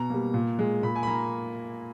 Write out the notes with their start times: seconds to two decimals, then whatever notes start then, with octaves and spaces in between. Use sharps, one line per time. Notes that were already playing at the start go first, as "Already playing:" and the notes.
Already playing: B2 A#5
0.10 G3 A#3
0.34 A#2
0.59 G#3
0.83 A#2 B5
0.96 G#5
1.03 B5
1.07 A#3 A#5